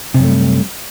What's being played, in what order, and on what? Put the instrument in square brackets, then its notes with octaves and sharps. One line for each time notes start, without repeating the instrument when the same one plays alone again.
[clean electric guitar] C3
F#2
A3
G3